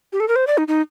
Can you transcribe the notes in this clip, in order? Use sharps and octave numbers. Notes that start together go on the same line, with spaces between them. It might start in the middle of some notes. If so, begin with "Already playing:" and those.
G4
A4
A#4
C5
D5
D#4
D#4